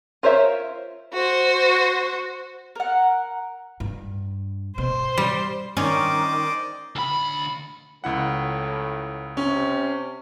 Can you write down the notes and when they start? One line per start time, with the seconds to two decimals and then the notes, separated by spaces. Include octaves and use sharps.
0.23 F4 A#4 C5 C#5 E5
1.13 F#4 C5
2.75 A#4 F#5
3.80 G2
4.78 B2 C5
5.18 G3
5.77 D#3 C#4 C5 D5 D#5 D6
6.96 D2 B5
8.04 C#2 A2 E4 F#5
9.37 C3 C#4